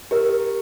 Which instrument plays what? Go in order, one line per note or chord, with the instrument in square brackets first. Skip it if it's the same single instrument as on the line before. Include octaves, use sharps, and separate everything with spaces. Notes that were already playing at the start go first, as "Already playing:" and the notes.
[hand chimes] G4 [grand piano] A#4